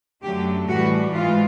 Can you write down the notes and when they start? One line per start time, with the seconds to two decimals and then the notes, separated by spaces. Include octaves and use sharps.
0.23 F#2 D3 F#3 A3 G4
0.68 A2 E3 G3 F#4
1.12 G#2 E3 G#3 F4